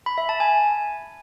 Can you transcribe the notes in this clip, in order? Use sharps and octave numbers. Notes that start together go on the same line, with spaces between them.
B5
E5
A5
G#5